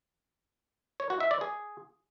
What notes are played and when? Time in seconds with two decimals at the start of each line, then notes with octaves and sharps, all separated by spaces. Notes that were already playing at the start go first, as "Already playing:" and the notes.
1.00 C#5
1.10 F#4
1.20 E5
1.31 D5
1.41 G#4